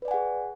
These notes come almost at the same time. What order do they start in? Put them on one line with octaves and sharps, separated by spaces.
B4 D5 G#5 F#5 G#4